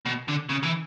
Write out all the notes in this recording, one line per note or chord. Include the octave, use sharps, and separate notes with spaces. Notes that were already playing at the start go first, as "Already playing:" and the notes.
B2
D3
C#3
E3